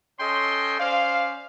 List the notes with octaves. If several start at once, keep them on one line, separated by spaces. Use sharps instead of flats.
C#4 A4 C#5 D#5 G5 C6
C#4 C5 D5 F5